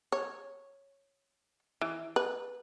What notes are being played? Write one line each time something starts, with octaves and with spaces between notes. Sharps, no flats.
C#5
E3
B4